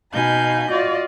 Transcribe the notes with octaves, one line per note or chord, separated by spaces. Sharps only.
B2 D#4 F5 G#5 B5 G6
F4 F#4 D5 D#5